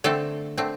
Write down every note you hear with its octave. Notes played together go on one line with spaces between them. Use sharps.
D3 A3 C4 A4
D3 A3 C4